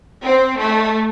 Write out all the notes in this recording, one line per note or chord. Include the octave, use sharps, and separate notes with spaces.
C4
A3